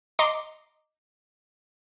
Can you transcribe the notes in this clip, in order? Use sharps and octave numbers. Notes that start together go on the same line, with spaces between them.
D#5 A#5 C6 D6